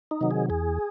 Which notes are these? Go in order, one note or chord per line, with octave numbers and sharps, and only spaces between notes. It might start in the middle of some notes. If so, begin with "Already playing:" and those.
D#4
C3 D#3 F#3
G#4
E2 G#4